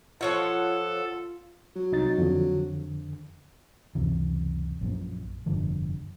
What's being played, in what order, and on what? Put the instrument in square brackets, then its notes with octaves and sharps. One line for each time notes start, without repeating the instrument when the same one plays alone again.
[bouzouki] F3 C#5 F#5 [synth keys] F4 [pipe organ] A4
[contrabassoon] F#3
[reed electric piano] C2 D#4 A6
F2 D3
[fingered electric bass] C#2 F#2 C3 E3
A#1 F#2 A#2
F1 G2 D3 F3